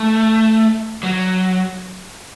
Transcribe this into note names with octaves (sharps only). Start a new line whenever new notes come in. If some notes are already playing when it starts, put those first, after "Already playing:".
Already playing: A3
F#3